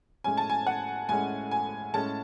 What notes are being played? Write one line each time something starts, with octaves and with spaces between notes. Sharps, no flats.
A2 G#3 C#4 G#5
A5
G#5
F#5
A2 G#3 C#4 G#5
G#5
A2 G#3 C#4 A5